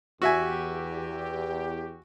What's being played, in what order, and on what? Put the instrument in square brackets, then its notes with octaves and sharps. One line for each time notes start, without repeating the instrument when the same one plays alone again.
[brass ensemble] E2 G4 [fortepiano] F#4 E5 G#5